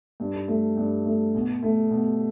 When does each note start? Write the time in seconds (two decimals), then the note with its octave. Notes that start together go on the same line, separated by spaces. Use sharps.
0.20 G2
0.48 A3
0.77 G2
1.06 A3
1.35 B2
1.63 A3
1.91 B2